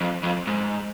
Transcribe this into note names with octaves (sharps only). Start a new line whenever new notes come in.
F2
F2
G#2